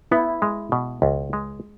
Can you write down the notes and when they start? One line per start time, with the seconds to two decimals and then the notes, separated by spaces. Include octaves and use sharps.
0.11 B3 E4
0.42 G#3
0.72 B2
1.02 C#2
1.33 G#3